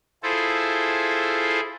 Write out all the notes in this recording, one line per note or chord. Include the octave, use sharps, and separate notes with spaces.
E4 F4 G#4 A4 C5